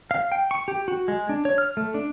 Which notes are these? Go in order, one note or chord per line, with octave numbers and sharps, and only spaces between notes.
F5
G5
C#6
G4
F#4
G#3
D4
C#5
F6
A3
D4